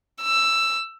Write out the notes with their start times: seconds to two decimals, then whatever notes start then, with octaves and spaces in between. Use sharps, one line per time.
0.22 E6